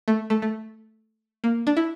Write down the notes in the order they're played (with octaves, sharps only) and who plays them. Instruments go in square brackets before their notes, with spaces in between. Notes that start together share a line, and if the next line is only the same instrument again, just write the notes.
[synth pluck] A3
A3
A3
A#3
D4
E4